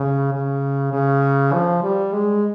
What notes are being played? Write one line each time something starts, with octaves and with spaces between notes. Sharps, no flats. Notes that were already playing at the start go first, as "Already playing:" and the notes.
Already playing: C#3
C#3
C#3
F3
G3
G#3